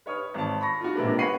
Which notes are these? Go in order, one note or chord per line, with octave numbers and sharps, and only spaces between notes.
B4 C#5 D#6 F6
G#1 A5
B5 C#6 A#6
F4 F#4
C3 G#3 A#3 D4 B4
B3 C#5 F#5 B5 C7 D#7